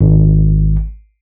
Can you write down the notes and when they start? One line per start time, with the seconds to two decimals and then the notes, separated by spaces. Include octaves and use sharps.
0.01 G#1